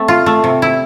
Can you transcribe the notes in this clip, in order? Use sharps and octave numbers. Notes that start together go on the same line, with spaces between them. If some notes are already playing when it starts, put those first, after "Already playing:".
Already playing: A3 C4
F4
A3
C3
E4